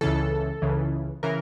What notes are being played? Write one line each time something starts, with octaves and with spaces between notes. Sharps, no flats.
C#2 C#3 E3 A4
C#2 C#3 E3
C#3 E3 A#4